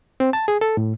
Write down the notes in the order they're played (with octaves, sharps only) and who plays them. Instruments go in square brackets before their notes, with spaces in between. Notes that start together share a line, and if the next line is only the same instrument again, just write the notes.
[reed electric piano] C4
A5
G#4
A4
A2